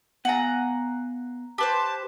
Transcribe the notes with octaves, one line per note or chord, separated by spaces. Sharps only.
B3 F5 F#5 G#5 A#5
G4 B4 C5 A5